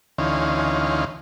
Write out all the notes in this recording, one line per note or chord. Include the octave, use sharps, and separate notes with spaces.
D2 E3 C#4 D#4 F5 C6